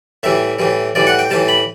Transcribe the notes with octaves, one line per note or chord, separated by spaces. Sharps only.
A2 E3 G3 E5
A2 E3 G3
A2 E3 G3 D5
F#5
G5
A2 E3 G3 A5
B5